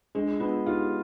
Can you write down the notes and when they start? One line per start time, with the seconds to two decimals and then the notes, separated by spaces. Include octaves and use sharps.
0.15 G#3 D4 F4
0.40 B3 D4 F4
0.66 D#4 F4 G4